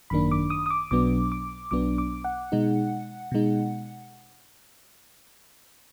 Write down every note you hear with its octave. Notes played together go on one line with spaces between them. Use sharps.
G#1 F#2 D#3 A#3 D4 B5
D6
D#6
D#6
D6
B1 B2 F#3 B3 D4 D6
D6
B1 B2 F#3 B3 D4 D6
D6
F#5
B2 G#3 D#4
B2 G#3 D#4